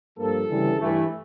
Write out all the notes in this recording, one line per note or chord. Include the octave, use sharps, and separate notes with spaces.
G2 F3 A#3 A4
D2 C#3 E3 G3
G2 E3 A3